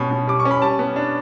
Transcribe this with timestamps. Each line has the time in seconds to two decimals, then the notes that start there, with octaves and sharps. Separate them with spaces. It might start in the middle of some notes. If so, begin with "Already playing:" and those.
Already playing: B2 G3 C#4 B5
0.11 B2
0.27 G3 D6
0.40 C#6
0.45 C#4
0.51 B5
0.62 G3 A5
0.79 B3
0.96 D4